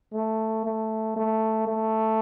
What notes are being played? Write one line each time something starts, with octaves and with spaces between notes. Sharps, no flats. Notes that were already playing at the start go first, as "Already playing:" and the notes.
A3
A3
A3
A3